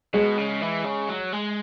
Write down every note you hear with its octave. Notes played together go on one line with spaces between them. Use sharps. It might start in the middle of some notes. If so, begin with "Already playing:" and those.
B2 G#3
C#3
E3
C#3
F#3
G#3